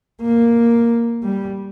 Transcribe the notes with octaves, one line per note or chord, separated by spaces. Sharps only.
A#3
G3